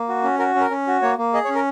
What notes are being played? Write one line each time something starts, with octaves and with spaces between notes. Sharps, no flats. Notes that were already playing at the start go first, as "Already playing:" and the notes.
Already playing: A#3
F#4
C#4
F#4 A#4
C#4
A#4
C#4
F#4
A#3 C#5
A#3
G#4 D#5
C#5
C#4
A#4